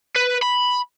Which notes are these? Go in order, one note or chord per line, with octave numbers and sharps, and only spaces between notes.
B4
B5